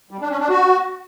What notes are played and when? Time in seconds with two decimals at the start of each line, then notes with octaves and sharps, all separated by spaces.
0.11 G3
0.21 D4
0.30 C#4
0.40 D4
0.50 F#4